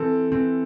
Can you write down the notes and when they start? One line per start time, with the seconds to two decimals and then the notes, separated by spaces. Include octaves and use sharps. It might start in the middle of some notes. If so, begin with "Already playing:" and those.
Already playing: E3 C4 A4
0.32 E3 C4